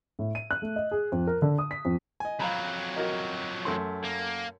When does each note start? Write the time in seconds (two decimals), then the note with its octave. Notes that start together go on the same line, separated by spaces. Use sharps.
0.19 A2
0.35 D#7
0.51 F#6
0.62 A3
0.76 D#5
0.91 G#4
1.12 F2
1.27 A#4
1.42 D3
1.58 D#6
1.71 B6
1.85 F2
2.20 D#5 G#5
2.40 F2 F#3 F5 A#5 B5
2.96 F#4 A#4 D#5
3.65 F#2 A3 C6
4.03 A#3